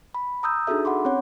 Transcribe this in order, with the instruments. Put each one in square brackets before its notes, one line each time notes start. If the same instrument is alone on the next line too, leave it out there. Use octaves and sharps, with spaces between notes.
[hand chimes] B5
A#5 D#6 E6 G6
D4 D#4 F#4 G#4 A4 E5
F#5 B5 C6 D6
C4 C#4 C#5 F#5